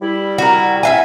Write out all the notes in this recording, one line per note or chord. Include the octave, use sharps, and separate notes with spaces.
G3 E4
F#4 A#4
E5 F5 G#5